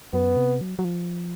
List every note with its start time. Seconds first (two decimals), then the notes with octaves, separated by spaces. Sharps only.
0.13 F#2 B3
0.37 C3
0.61 F#3
0.79 F#3
0.84 F3